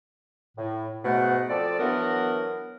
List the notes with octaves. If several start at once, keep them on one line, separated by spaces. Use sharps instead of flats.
A2
G#2 B2 A3 F#5
F3 C4 A4 D5
E3 F#3 B3 D4 A#4